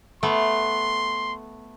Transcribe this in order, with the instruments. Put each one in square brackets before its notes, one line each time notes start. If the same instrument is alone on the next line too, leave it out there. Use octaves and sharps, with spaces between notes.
[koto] A3 B3 [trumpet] C6